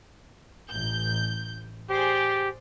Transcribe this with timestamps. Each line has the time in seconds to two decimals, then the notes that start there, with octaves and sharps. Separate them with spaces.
0.70 A1 G6
1.90 G4 G#4 C5 D5